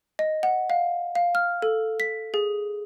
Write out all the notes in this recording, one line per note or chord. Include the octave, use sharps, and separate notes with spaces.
D#5
F#5
F5
F5
F6
A4
B6
G#4